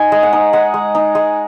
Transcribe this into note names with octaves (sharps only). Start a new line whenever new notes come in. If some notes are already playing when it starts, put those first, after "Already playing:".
Already playing: D#4 G#5
G#3
F#5
D#4
G#3 F#5
G#3
D#4
G#3